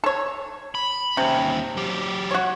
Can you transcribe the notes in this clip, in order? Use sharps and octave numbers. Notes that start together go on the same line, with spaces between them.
A4 C#5
B5
D#2 C3 C#4
F#3 G4
F#4 C#5